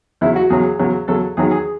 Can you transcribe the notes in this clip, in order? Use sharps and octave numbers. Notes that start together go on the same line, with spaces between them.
E2 C#3 F#3 E4
F#4
E2 C#3 F#3 G#4
E2 C#3 F#3
E2 C#3 F#3 A4
E2 D#3 F#3 G#4
G#4